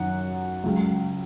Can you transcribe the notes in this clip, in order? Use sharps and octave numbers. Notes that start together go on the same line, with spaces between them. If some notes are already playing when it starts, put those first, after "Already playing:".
Already playing: F#2 D#3 F#3 F#5
C#2 C#3 F#3